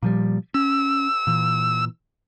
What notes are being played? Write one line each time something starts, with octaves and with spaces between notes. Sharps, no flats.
A#2 F3 G3
C#4 E6
A#2 E3